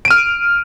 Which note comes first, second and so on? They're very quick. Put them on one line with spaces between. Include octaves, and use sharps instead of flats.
D7 D#7 F6